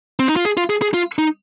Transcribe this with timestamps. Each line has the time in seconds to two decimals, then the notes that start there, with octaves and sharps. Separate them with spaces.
0.19 C4
0.28 D#4
0.36 F4
0.45 G#4
0.57 F4
0.70 G#4
0.82 G#4
0.94 F4
1.18 D#4